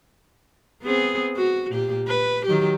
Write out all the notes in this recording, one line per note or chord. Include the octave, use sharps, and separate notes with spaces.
B3 C4 G#4
F#4
A#2 G4
B4
D#3 F#3 G4